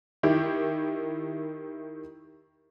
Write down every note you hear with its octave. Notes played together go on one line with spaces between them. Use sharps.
D#3 E4 G4